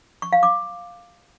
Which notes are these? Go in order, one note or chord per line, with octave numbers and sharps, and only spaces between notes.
C#6
F5
D6